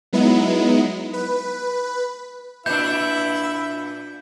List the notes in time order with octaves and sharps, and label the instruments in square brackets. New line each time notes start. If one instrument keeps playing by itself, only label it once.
[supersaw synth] F#3 G#3 B3 D#4 E4
B4
[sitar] A#2 D4 [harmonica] E4 E5 [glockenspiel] G6